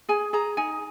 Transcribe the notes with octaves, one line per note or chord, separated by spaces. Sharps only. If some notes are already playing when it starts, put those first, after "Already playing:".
G#4 G#5
G#4 A#5
D#4 G#5